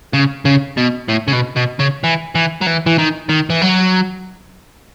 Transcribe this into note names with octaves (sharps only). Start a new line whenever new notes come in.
C#3
C#3
B2
A2
C#3
B2
B2
C#3
E3
E3
F#3
E3
E3
D#3
D#3
E3
F#3